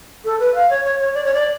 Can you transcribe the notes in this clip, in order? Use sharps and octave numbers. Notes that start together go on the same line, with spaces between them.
A4
B4
F5
C#5
C#5
C#5
D5
C#5
D5